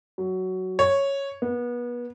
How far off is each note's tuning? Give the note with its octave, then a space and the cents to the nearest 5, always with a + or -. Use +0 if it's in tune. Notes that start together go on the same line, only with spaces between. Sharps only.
F#3 +10
C#5 -5
B3 -30